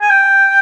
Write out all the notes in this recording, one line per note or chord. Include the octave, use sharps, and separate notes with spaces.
G#5
G5